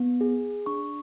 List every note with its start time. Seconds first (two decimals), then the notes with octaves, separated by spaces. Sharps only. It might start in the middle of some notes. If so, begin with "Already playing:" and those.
Already playing: B3
0.21 G#4
0.66 D4 C#6